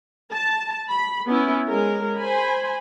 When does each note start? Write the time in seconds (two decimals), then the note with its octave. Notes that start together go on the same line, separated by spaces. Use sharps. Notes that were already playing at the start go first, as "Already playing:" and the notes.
0.32 A5
0.89 B5
1.27 B3 C#4 E4
1.68 G#3 C#4 A#4
2.18 C5 G#5 B5